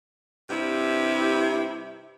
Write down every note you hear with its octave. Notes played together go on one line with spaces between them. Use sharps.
G2 C3 E4 G4